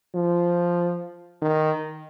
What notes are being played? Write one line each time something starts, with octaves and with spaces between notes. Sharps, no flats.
F3
D#3